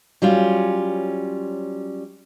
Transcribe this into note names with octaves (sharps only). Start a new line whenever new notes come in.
F#3 G3 C#4 F4